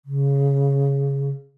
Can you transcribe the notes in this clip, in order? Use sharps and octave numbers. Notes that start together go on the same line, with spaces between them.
C#3